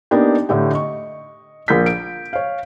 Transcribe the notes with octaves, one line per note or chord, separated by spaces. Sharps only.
A#3 B3 D4 D#4 G4
A2 D3 A3 G4
D#5 C#6
A#1 A#4 G6 B6
D7
C#5 F5